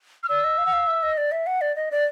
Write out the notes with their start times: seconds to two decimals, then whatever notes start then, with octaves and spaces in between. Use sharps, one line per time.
0.23 F6
0.29 D5 E6
0.44 D#5
0.58 F5
0.66 F#5
0.73 F5
0.87 E5
1.03 D#5
1.17 D5
1.32 E5
1.47 F#5
1.61 D5
1.76 D#5
1.91 D5